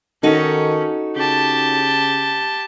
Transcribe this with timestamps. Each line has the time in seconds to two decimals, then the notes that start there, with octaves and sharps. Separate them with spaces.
0.23 D#3 C#4 D#4 F#4 A4
1.16 C#3 G4 A5